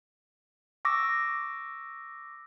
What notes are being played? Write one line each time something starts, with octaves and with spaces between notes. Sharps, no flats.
C#6 D6 E6 A#6